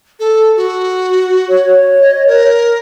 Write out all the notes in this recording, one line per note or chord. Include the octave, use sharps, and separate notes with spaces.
A4
F#4
C#5
D#5
A#4